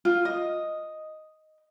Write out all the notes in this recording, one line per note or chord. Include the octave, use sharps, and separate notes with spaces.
F4
D#5